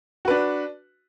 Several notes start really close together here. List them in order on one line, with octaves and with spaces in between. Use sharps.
F#4 B4 D4